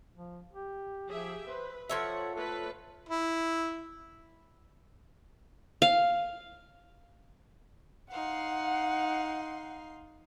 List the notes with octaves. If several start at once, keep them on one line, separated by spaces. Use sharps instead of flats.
F3
G4
F3 G4 G#4 E5
B4 C5
F3 A4 C#5 E5 F#5
A3 F4 A4 B4
E4
F5
D#4 F5 F#5 C6